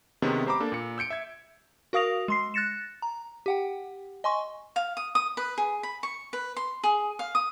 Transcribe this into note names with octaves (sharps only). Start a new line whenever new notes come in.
C3 D#3 G#3 B3 C#4
G4 C5 A#5 B5 D6
A#3 D4 A4
A#2 C#7
E6 G6 C#7 D7
E5 G#6
F#4 A#4 F5 D#6 A#6 F7
G#3 C6 C7
F#6 A6 A#6 C#7 E7
A#5
G4 F#5 G5
D#5 G#5 C6 C#6
F5
D#6
D#6
B4
G#4
B5
C#6
B4
C6
G#4
F5
D#6